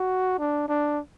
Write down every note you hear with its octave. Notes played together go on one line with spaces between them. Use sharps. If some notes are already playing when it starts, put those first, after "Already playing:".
Already playing: F#4
D4
D4